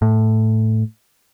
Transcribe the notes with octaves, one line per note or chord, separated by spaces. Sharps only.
A2